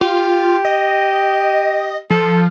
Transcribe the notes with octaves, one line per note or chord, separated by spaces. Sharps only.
F4 G4
D#5
F3 A4